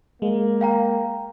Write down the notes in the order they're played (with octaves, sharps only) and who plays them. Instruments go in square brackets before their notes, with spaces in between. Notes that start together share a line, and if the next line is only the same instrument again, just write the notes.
[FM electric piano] G#3 [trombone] A#3
[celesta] F5 G5 A#5